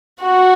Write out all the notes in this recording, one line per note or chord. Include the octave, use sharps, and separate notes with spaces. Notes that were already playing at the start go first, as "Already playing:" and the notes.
F#4